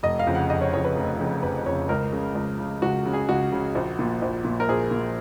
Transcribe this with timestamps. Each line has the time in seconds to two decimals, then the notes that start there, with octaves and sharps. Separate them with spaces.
0.03 F1 D#5
0.19 F5
0.27 F2 C#3
0.35 F#5
0.49 F1 D#5
0.61 C#5
0.73 F2 C#3 C#5
0.85 B4
0.97 F1
1.20 F2 C#3
1.42 F1 B4
1.66 F2 C#3 C#5
1.89 C#2 A#4
2.12 C#3
2.35 C#2
2.59 C#3
2.82 C#2 F#4
3.06 C#3
3.13 G#4
3.29 C#2 F#4
3.52 C#3
3.75 A#1
3.99 A#2
4.22 A#1
4.45 A#2
4.60 A#4
4.69 A#1 G#4
4.91 A#2